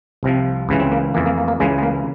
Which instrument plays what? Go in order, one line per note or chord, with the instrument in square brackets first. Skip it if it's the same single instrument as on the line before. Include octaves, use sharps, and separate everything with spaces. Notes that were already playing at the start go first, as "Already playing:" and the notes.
[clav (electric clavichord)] C2 C3 F3
C#2 C#3 E3
C4
A#3
F2 E3 A#3
A#3
A#3
A#3
C#2 C#3 E3 G#3
G#3
A#3